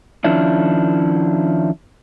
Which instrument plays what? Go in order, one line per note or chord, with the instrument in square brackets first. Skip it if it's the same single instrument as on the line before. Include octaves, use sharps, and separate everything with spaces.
[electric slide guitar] D#3 F3 C#4 D4 E4